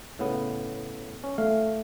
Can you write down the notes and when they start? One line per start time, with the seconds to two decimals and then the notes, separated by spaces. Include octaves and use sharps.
0.19 A2 C#3 B3
1.24 C#4
1.38 A3 F5